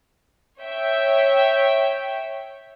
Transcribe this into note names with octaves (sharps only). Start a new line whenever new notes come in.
C#5 E5 G5